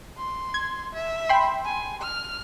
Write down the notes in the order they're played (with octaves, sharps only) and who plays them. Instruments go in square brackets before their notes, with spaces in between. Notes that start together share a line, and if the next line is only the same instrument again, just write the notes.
[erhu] C6
[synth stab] G#6
[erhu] E5
[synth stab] G5 B5 C6
[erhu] G#5
F6